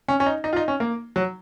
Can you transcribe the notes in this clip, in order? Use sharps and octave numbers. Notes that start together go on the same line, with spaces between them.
C#4
C#4
D#4
D#4
F4
D#4
C#4
A#3
F#3